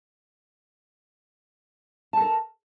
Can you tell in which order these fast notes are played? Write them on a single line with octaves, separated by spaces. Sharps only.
A5 A4 A#4